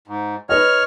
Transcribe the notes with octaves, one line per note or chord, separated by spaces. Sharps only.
G#2
B4 C#5 D#5 F6